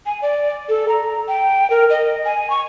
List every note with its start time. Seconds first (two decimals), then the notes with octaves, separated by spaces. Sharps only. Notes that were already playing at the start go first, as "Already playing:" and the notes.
0.06 G#5
0.22 D5
0.69 A4
0.89 A#5
1.28 G5
1.70 A#4
1.90 D#5
2.25 G#5
2.50 C#6